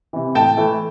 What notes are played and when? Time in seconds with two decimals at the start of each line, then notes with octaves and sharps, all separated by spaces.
0.13 C3 E3
0.35 A2 G5 A5
0.57 E3 A3